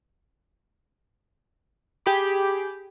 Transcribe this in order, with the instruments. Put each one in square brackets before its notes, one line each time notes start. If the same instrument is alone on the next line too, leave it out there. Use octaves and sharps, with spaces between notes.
[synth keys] G4 G#4 B5 D6